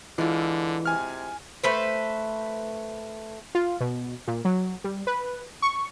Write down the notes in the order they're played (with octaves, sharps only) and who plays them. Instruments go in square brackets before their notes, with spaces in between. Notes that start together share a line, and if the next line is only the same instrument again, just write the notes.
[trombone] D3 [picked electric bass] E3 [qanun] G#3 E4 F4
[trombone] C3 [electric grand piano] G#5 F6
[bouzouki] A3 B4 C5
[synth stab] F4
B2
A#2
F#3
G3
B4
C#6